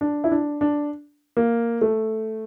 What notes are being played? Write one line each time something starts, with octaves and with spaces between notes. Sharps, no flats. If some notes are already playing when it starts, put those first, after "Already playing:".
D4
E4
D4
D4
A#3
A3